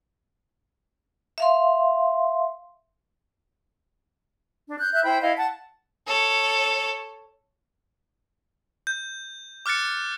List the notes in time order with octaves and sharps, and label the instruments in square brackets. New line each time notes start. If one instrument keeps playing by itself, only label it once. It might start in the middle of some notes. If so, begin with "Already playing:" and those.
[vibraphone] E5 F5 C6
[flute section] D4
F#6 G6
E5 F#6 G6
E4 C5 G5 B5
E4 D#5 F5
F#5 A5
[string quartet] A4 C#5
[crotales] G6
D6 F6 F#6 A6 C#7